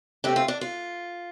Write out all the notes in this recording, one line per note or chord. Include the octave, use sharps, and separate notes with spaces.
C3 A3 C4 D4 G4
F4
D4
F4